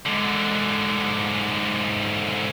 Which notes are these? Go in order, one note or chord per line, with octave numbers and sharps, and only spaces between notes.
G#2 D3